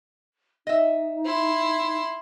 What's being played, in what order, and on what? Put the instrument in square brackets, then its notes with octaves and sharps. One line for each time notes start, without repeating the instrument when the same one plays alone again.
[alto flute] D#4 [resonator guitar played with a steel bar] D#5 E5
[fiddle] E4 C6